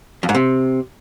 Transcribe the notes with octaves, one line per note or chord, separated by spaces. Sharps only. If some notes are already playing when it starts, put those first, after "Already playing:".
F2
G#2
C3